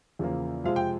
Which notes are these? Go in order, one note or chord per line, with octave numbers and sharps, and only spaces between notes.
E2 C#3 F3 A#3
F2 C3 F3 G#3 F5
G5